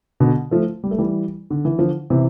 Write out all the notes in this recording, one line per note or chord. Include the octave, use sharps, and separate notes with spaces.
B2 D3
F3 A3
G3
A3
E3 G3
D3
E3
D3 F3
C3 E3